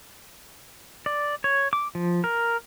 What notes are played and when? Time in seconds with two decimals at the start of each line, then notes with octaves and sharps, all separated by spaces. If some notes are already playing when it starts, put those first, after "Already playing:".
1.06 D5
1.44 C#5
1.73 D6
1.95 F3
2.24 A#4